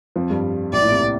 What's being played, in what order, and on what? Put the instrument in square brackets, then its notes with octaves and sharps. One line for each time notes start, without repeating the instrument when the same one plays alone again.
[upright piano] F2 F3
G2 G3
[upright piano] A#1 A#2 [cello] D5
[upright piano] A2
C2 C3